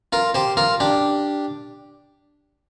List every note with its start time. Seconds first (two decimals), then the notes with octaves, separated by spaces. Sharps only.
0.13 F4 A#4
0.34 G4 C5
0.57 F4 A#4
0.80 D4 G4